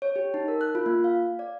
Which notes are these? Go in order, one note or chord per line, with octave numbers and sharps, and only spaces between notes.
C#5
G4
D#4
A#4
F#6
F4
A#3
F5
F5
D5